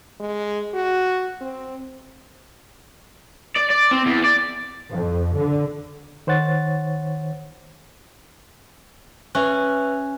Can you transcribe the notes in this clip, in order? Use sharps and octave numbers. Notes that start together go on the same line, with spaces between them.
G#3
F#4
C4
D5
D5
C4
E2
D5
F2
D3
D#3 C5 C#5 F#5 A6
C#4 B4 E5 F#6